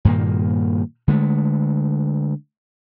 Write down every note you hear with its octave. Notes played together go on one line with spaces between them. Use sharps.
G2 A#2 D#3 A#3
D3 G#3 A3